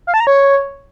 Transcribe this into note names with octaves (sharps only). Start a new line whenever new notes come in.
F5
A5
A#5
C#5